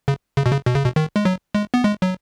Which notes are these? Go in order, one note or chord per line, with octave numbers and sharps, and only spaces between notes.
C#3
C#3
B2
C#3
B2
C#3
B2
D#3
G#3
F#3
G#3
B3
G#3
F#3